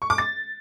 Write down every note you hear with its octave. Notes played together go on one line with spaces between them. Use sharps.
C#6
D6
A6